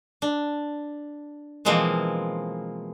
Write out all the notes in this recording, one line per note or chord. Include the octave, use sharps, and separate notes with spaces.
D4
B2 E3 F3 G#3 A#3 C4